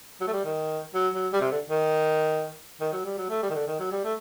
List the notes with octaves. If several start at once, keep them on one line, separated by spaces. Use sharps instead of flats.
F#3
A3
G3
D#3
F#3
F#3
G3
C3
D3
D#3
D#3
F#3
G3
F#3
A3
G3
D#3
D3
D#3
F#3
G3
A3